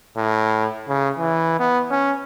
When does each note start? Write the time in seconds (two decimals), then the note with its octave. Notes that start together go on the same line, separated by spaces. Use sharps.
0.17 A2
0.89 C#3
1.18 E3
1.60 B3
1.90 C#4